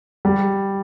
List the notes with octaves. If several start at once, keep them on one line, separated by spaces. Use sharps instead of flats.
G3